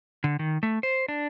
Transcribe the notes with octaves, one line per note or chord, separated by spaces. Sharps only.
D3
D#3
A3
C5
D4